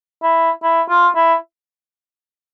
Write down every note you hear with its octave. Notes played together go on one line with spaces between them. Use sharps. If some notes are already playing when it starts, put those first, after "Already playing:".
E4
E4
F4
E4